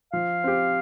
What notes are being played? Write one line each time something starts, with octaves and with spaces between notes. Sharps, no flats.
F3 F5
C4 G4